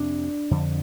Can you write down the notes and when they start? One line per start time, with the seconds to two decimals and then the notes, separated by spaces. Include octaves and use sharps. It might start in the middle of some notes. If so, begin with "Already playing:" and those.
Already playing: F2 C3 D4
0.51 F2 D3